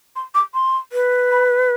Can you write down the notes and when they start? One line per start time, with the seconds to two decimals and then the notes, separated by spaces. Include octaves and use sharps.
0.16 C6
0.35 D6
0.54 C6
0.93 B4
1.31 B5